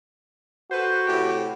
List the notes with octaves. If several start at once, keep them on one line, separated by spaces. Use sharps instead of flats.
F#4 A4 B4 C5
A2 C3 G4